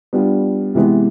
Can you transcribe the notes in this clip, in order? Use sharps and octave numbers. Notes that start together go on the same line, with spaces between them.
G3 B3 D4 F4
C3 E3 G#3 B3